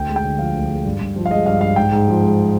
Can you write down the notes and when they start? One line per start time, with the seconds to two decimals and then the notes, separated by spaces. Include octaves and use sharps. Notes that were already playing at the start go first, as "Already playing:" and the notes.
Already playing: D2 G5
0.09 G#3
0.16 G5
0.24 D3
0.39 F3 F5
0.55 D2
0.70 G#3
0.85 G2
1.00 G2
1.16 F3
1.26 F5
1.31 G#3 D#5
1.46 G2 F5
1.61 G2 F5
1.76 G#2 G5
1.92 G#2
2.08 F3
2.23 G#3